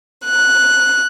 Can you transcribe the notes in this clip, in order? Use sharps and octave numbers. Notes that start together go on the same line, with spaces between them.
F#6